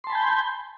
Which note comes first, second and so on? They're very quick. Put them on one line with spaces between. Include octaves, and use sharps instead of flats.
C6 A5 B5 G#5 G6